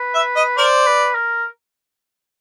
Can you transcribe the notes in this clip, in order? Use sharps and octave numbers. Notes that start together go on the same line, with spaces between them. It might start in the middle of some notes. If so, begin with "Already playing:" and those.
Already playing: B4
E5
D#5
A#4 C5 D5
B4
A#4